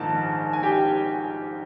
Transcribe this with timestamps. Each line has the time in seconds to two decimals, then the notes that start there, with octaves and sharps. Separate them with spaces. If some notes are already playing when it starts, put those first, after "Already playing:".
Already playing: A#1 G#2 D#3 A5
0.53 G#5
0.63 G4 G5